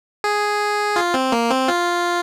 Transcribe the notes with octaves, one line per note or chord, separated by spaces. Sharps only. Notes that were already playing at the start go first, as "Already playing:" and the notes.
G#4
F4
C4
A#3
C4
F4